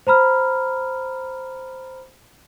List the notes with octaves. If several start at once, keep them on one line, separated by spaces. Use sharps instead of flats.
C5 A#5 B5 F6